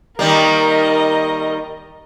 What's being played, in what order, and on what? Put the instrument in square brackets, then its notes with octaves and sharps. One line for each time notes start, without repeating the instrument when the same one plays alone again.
[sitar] D#3 G3 A#3 [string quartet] A#4 D#5